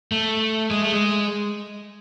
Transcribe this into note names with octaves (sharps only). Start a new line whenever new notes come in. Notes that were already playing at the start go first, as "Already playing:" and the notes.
A3
G#3
A3
G#3